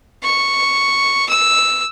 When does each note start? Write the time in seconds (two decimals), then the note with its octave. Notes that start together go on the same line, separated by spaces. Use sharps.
0.24 C#6
1.29 E6